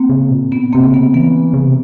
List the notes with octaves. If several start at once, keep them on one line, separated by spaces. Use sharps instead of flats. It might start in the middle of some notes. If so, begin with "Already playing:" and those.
Already playing: A#3 C4
C#3
A#2
B3 C#4
C3 A#3 C4
C#3
B3
E3 B3
C#3
C3